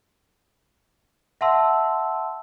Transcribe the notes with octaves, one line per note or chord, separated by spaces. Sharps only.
E5 F#5 A5 C6 E6